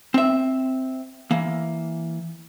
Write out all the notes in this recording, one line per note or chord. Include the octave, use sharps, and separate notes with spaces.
C4 E5
E3 A#3